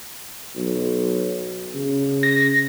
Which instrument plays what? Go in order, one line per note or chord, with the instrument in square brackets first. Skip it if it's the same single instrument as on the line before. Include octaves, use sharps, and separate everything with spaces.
[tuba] B1
C#3
[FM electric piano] A#6